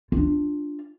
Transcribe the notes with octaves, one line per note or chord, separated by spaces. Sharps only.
D4 F4